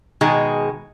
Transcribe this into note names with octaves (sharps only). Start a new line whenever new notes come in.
B2 D#3 G#3 G#4